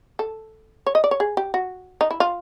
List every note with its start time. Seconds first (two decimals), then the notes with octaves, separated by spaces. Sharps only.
0.19 A4
0.86 C#5
0.95 D#5
1.04 D5
1.11 C#5
1.20 G#4
1.37 G4
1.54 F#4
2.01 D#4
2.11 E4
2.20 F4